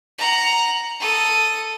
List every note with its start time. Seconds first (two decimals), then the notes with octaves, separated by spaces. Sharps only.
0.18 F#5 A#5
1.00 A4 D#6